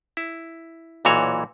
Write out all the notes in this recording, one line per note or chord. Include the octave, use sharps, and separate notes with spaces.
E4
B1 A#2 E3 F#4 C#5